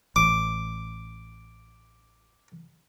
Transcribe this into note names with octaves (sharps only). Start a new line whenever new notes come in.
A1 D6